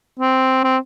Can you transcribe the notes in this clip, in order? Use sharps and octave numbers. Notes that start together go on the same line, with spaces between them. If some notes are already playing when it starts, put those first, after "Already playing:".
C4
C4